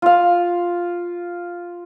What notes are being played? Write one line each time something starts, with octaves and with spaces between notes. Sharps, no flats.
F4 F5